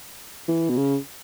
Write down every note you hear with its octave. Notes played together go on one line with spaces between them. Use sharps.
E3
B2
C#3